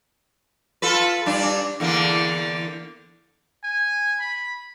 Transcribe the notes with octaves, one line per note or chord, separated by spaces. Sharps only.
F4 A4 B4
G2 D4
E2 D3 A#3
G#5
B5